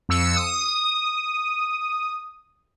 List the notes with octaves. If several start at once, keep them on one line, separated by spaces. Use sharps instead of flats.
F2 E6 C#7
D#6